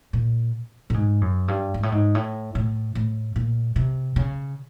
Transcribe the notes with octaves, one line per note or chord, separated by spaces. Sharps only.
A#2
A2
G#2
F#2
G2
G#2
A2
G#2
A2
A2
A2
A#2
C3
C#3